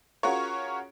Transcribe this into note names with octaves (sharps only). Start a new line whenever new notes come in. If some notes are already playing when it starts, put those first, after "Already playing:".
C#4 F4 F#4 G#4 A#4 C#5